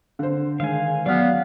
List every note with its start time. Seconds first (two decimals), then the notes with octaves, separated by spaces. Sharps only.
0.19 D3 C5
0.60 D#3 G#3 F5 G#5
1.06 F#3 B3 D5 F5 F6